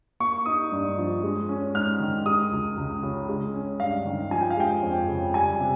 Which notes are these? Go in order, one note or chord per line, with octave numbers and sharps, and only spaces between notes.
A#3 C#6
D#4 D#6
G2
F3
G#3
C#4
G#2 F6
D#3
G#3 D#6
C#2
C#2
C#3
G#3
C#4
G2 F5
D#3
F3 G#5
G5
F5
G#3 G5
F2
C#3
G3 G#5
C3